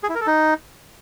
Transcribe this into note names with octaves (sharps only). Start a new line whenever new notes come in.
G#4
E4
A#4
A4
D#4